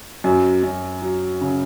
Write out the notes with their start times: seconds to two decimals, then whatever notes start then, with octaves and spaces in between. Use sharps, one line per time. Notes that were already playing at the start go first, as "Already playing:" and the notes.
0.24 F#2
0.63 F#2
1.02 F#3
1.41 C#3